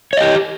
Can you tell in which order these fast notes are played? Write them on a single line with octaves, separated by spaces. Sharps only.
C#5 D#5 G4